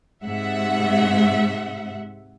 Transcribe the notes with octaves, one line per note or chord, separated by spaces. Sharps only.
G#2 C3 E5 F#5